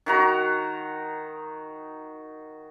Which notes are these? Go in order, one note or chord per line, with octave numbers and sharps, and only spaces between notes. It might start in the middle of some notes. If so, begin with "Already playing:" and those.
D#3 F#4 A#5